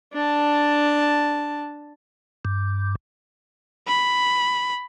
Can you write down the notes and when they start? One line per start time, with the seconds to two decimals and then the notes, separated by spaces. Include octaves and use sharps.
0.13 D4 A5
2.45 G2
3.88 B5